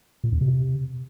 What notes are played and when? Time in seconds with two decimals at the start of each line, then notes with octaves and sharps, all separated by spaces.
0.24 A#2
0.32 E2
0.41 C3